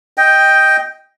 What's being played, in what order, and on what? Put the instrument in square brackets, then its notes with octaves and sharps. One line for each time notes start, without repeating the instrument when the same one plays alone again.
[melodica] D#5 G5